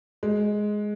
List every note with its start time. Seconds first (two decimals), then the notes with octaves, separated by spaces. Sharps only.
0.23 G#3